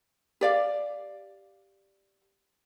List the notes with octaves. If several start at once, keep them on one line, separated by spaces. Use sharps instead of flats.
G4 D5 F5